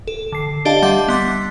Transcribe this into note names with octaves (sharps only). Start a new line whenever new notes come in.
A4
D3 C7
D4 G4 D5 D#5 F5 A5
G3 E5 F#5 D6
B3 C6 D6 A6